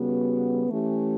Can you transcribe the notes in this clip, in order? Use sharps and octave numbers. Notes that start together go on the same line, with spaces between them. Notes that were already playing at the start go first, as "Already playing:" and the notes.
Already playing: C#3 G3 B3 F#4
E3 A3 C#4 G4